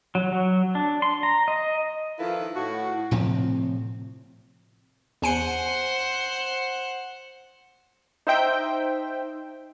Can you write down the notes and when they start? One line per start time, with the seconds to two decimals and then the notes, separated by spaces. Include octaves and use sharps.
0.15 F#3
0.32 F#3
0.75 D4
1.02 C6
1.23 A#5
1.48 D#5
2.19 D#3 F3 E4 F4 A4 B4
2.55 A2 F#4
3.11 A2 C3 F3 C4
5.22 E2 C5 F#5 G#5 C#7
8.27 D#4 C5 E5 G5